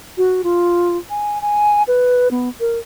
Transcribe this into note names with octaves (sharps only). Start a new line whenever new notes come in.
F#4
F4
G#5
G#5
B4
B3
A#4